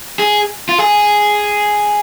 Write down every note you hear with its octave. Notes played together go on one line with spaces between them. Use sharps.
G#4
F4
G#4